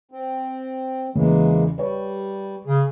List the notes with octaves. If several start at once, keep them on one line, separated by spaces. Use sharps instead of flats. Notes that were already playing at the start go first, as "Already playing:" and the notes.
C4
E2 C#3 E3 G#3 A#3
G3 B4 C#5
C#3 G#4